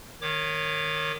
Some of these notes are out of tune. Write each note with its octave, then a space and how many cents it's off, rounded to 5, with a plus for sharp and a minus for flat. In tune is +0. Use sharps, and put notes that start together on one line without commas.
D#3 -10 C#5 +0 D6 +5